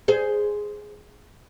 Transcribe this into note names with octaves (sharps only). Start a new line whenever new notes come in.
G#4 C5